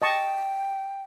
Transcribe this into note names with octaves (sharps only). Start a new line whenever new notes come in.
D#5 G5 A5 C#6